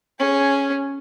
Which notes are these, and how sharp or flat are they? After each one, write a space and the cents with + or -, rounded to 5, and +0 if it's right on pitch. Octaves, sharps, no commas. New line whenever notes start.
C#4 +0 G#4 +5